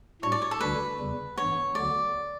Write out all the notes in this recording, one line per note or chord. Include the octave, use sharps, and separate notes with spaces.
A2 G3 D4 F#4 C#5
D5
C#5
A4
D2 D3 G3 D4 F#4 B4
E2 C#3 G3
G2 E3 B3 C#5
D2 D3 F#3 B3 F#4 D5